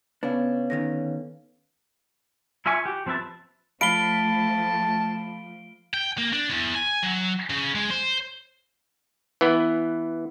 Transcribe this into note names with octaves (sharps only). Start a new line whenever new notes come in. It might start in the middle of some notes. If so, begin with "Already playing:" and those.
C#3 B3 D4 B4 C#5 F5
D3 D#3 C#4 A#6
E4 F4 E5 G#5 C#6
F#4 G4
F3 C4 B4 E5 A5
F3 A3 F5 A5 B5 D7 G7
G5
A#3
D4
E2
G#5
F#3
C#3
G#3
C5
E3 B3